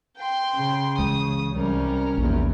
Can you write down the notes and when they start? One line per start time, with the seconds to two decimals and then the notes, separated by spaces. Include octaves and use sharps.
0.17 G5 C6
0.56 C#3
0.98 C#2 E3 D#6
1.54 C2 G3 C#4 A#4
2.17 F1 A#1 E2